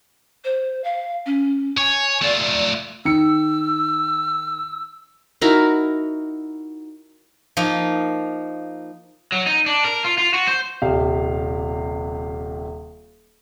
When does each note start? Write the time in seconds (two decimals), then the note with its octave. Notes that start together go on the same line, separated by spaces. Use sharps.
0.44 C5
0.83 F5
1.25 C#4
1.77 C#5 G#5
2.22 A3 F4 D5
3.05 D#3 E6 C#7
5.41 D#4 E4 F#4 A#4
7.57 F3 A#3 D#4
9.32 F#3
9.46 D#4
9.66 D4
9.84 A#4
10.05 F4
10.18 F4
10.34 F#4
10.47 C5
10.82 D#1 C3 G4 F5